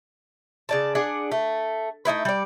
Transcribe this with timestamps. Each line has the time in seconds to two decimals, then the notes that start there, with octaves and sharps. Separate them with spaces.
0.69 C#3 D5 A5
0.95 D4 G#4 F#5
1.31 A3
2.05 A3 D#4 E4 B4
2.25 G3 D5